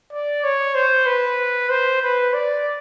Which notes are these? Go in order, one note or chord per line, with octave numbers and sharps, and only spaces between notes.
D5
C#5
C5
B4
C5
B4
D5